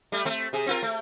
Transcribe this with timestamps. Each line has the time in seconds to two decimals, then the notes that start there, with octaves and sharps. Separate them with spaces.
0.12 G3 A3
0.25 A3 C4
0.53 C3 G#4
0.66 C4 F4 A#4
0.83 A3